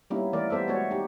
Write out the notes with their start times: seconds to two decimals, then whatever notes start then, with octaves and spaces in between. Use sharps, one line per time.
0.10 G3 A#3 B3 C#4 D#4 E4
0.33 E3 A3 A#4 D5
0.50 G3 B3 A4 C5 E5
0.68 G#3 A3 B3 F#4 C#5
0.91 D#4 G4